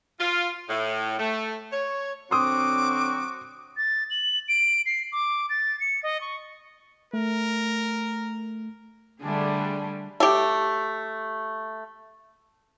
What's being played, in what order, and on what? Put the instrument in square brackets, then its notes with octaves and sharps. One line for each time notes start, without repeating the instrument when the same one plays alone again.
[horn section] F4
A2
A3
C#5
[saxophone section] D3 F#3 C4 [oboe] F#4 [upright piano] C6 D#6 [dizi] D6
[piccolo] A6
F#7
D7
C7
D6
A6
C#7
D#5
C#6
[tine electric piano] A3 [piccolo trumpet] A#4
[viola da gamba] D3 G3 [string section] A3 D4 G#4
[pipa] A3 G4